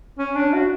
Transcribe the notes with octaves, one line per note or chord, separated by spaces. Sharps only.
C#4
D4
F#4